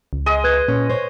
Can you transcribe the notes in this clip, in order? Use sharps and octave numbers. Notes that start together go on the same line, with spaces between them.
C#2
G#3 D#5
B4 F#6 G#6
A#2 C#4
C5 C#5